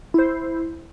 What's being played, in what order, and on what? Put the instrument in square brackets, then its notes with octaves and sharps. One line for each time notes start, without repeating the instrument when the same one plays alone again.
[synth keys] E4 C5